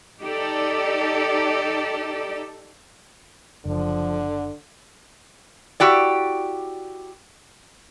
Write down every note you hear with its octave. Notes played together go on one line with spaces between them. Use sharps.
D#4 G4 A4 D5
F#1 D3 F3
E4 F#4 G4 D5